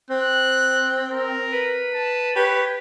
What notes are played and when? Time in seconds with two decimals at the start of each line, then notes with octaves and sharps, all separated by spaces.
0.10 C4 F#6
1.11 A#4
1.52 B4
1.94 A5
2.36 G4 B4 C#5